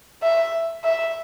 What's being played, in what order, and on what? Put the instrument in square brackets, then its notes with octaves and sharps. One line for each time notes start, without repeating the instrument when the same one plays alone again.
[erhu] E5
E5